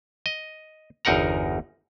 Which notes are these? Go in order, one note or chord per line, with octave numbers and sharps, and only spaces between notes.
D#5
G1 E2 D#4 A#4 F#5 A#5